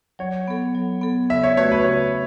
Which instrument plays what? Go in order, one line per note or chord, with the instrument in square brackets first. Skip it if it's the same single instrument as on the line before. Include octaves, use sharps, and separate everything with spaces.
[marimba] F#3 [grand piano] C#5
[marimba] B3 A4
F#3
B3 A4
[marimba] C#3 [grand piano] E5
[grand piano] C#5
[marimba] A3 F#4 B4 [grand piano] C#5
[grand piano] B4
[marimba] C#3 [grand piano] C#5